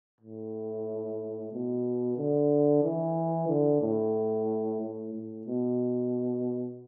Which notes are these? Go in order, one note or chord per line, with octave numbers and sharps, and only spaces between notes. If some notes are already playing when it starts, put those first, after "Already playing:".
A2
B2
D3
E3
D3
A2
A2
A2
B2